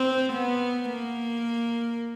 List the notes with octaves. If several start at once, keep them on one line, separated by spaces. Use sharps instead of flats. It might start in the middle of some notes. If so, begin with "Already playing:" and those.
Already playing: C4
B3
A#3